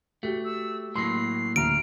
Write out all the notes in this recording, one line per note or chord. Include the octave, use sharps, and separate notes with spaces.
A3 F#4 G4
E6
A2 F#3 A#3 C6 C7
D2 A#5 F6 D7